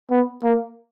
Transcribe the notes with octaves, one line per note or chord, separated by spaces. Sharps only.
B3
A#3